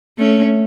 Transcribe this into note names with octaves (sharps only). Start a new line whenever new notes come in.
A3 C#4